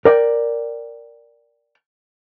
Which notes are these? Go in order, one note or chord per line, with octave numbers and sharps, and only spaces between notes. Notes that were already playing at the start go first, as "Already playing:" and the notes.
A#4 D5 G5